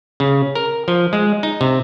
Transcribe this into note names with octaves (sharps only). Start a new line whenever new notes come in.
C#3
A#4
F3
G#3
D#4
C3